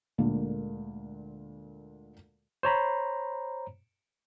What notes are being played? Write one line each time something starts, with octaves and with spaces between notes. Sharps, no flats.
D2 A#2 D3 G#3 A#3
C5 C#5 A#5 B5